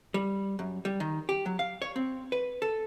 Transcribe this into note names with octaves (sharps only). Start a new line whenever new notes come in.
G3
F#2
G3
D#3
G4
F#3
F5
C#5
C4
B4
A4